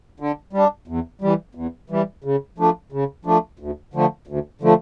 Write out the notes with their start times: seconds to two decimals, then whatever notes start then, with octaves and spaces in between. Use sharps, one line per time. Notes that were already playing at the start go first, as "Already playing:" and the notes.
0.20 D3
0.53 G3 D4
0.88 E2
1.21 E3 G3
1.55 E2
1.90 E3 G3
2.24 C#3
2.58 F3 A3 D4
2.92 C#3
3.25 F3 A3 D4
3.59 D2
3.94 D3 F3 A3
4.27 D2
4.61 D3 F3 A3